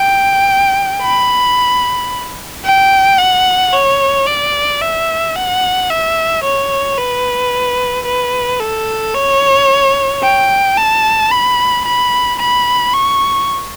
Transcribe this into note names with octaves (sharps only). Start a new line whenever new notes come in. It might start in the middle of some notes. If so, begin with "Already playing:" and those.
Already playing: G5
B5
G5
F#5
C#5
D5
E5
F#5
E5
C#5
B4
B4
A4
C#5
G5
A5
B5
B5
B5
C#6